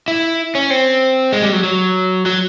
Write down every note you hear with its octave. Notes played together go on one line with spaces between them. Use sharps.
E4
C#4
C4
G#3
G3
F#3
F#3
F#3